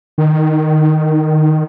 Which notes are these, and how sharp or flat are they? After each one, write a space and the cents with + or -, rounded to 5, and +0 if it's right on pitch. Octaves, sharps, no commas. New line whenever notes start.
D#3 -10